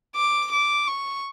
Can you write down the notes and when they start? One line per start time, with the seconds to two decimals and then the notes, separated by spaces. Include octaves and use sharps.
0.16 D6
0.52 D6
0.87 C#6